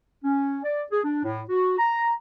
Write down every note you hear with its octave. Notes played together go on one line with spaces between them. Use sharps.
C#4
D5
G#4
D4
A2
F#4
A#5